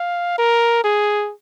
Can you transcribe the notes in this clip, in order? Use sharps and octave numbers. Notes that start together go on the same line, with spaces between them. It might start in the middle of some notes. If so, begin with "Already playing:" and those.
Already playing: F5
A#4
G#4